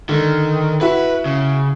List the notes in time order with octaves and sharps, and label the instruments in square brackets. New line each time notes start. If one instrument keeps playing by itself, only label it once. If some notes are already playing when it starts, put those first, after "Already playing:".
[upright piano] D3 [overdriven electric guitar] D#3
[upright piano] E4 F#4 [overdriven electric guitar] B4
[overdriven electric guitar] C#3